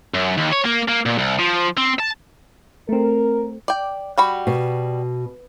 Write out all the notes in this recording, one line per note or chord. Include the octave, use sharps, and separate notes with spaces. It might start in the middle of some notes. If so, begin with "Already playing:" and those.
F#2
D#2
C#5
A#3
A#3
A#2
C2
F3
C4
A5
A3 C4 A#4
D5 G5
G3 F#4 B5
B2